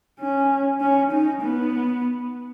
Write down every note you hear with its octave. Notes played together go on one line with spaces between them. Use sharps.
C#4
C#4
D#4
B3